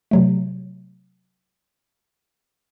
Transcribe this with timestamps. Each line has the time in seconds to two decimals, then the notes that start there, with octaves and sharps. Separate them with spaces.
0.11 C3 F#3 A3